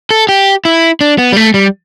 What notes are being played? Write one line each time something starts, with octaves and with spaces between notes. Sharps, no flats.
A4
G4
E4
D4
B3
G3
A3
G3